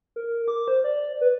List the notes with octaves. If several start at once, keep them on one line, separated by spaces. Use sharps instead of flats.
A#4
D6
C5
D5
B4